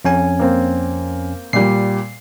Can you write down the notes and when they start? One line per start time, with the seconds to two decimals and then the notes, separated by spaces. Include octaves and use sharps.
0.05 F2 C#4 G#5
0.39 A#3 C4
1.53 A#2 G3 C7